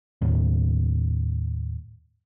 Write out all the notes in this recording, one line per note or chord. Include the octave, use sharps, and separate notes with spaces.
D#2 A2